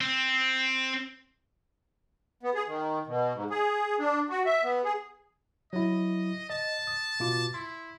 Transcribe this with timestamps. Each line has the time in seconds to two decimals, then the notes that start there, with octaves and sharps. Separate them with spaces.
0.01 C4
2.43 B3
2.55 G#4
2.67 D#3
3.07 B2
3.35 G#2
3.50 G#4
3.99 D4
4.30 F#4
4.46 E5
4.64 B3
4.84 G#4
5.73 F#3 E4 D#5
6.50 D#5 A5
6.87 D#6
7.20 B2 F4 D6
7.54 E4 C6